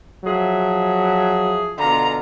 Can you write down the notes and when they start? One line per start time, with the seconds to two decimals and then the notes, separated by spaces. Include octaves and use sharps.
0.24 F3 F#3 G#4 E5
1.79 B2 D3 F4 A#5